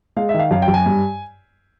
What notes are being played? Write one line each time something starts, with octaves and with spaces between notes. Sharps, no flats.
G#3 F5
E5
D#3
F5
F#2 F5
G5
F#2
G#5
G2